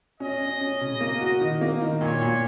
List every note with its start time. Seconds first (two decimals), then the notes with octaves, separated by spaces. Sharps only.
0.20 C#4 D#5
0.40 C#4
0.61 C#4
0.81 C#3
1.01 A#3
1.21 F#4
1.41 D#3
1.61 A#3
1.82 D#3
2.01 A#2 C#5
2.22 A#2